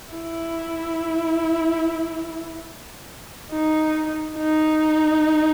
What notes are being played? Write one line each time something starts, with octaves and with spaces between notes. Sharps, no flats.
E4
D#4
D#4